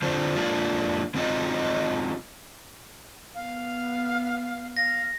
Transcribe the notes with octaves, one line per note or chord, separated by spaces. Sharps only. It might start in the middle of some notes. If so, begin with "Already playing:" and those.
D3 C4 D4 F4 C5
G#3 A#3 D4 F4
G#3 C4 D#4 F4 F#4 D#5
B3 F5
F5 A#6